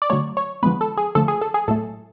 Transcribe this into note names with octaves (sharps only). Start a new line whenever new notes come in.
D5
D3 F#3 A3 C#5
C#5
D3 F3 G#3 B3 B4
A4
G#4
D3 F3 A3 A4
G#4
A4
G#4
A2 F#3 A3 A4